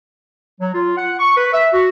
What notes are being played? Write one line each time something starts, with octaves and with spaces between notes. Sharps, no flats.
F#3
F4
F#5
C#6
B4
E5
F#4